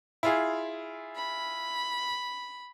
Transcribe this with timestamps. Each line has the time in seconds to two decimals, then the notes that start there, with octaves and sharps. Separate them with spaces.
0.23 E4 F4 G#4
1.16 B5